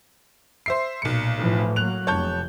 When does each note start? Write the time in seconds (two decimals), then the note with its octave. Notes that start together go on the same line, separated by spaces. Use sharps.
0.66 C5 E5 C7
1.02 B1 A#2 C#7
1.39 A2 E3 F3
1.76 F#3 A#3 F#6 F7
2.07 F1 C#5 A5 G6